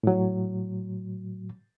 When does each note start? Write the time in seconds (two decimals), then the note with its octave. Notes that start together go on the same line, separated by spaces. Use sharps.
0.03 A2 F#3